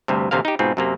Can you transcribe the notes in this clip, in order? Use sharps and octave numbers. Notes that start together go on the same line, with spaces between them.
D2 G2 C3
A1 D2 C3 A#3 F5
D#4 G4
G#2 B2 C4 F4
F#2 C3 A#3